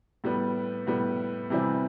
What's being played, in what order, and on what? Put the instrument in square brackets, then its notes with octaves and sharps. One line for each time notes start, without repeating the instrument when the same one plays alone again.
[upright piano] A2 G3 B3
A2 G3 B3
C3 E3 G3 C4 E4